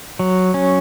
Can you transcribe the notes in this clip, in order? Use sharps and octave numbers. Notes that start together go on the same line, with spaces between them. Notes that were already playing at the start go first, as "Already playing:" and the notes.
F#3
C#4